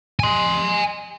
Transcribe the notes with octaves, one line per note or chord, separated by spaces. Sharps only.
G#5 C6